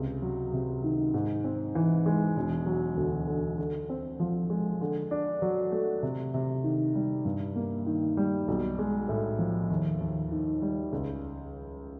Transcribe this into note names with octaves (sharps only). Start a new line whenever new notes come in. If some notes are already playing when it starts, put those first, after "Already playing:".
Already playing: C#2 C3
F#3
C3
D#3
G#2
C4
E3
G#3
E1
F#3
D2
D3
D3
C4
F3
G#3
D3
D4
F#3
A3
C3
C3
D#3
G3
G2
A#3
D#3
G3
B1
G#3
A2
F3
D#2
D#2
D#3
G3
C#2